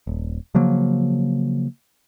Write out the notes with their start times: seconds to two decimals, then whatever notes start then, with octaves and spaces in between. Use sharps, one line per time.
0.07 D#1
0.55 C#3 F3 F#3 A#3